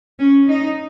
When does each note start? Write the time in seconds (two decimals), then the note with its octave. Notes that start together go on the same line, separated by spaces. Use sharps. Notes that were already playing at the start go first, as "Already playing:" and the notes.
0.19 C#4
0.48 D#4